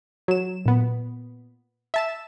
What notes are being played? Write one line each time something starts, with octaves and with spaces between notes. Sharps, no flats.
F#3 E7
A#2 B3
E5 A5 E7